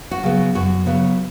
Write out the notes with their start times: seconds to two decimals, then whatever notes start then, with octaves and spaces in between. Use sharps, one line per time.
0.11 F#4
0.23 C#3 F#3 B3
0.54 F#2 F#4
0.86 C#3 F#3 B3